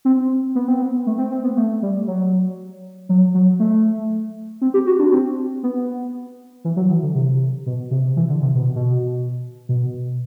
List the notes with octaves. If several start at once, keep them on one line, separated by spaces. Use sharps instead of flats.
C4
B3
C4
B3
A3
C4
C4
B3
A3
G3
F#3
F#3
F#3
A3
C4
G4
F#4
D4
C4
B3
E3
F#3
E3
D3
C3
B2
C3
E3
D3
C3
B2
B2
B2